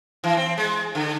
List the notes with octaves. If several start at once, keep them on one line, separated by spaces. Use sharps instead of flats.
E3
C4
G#3
D3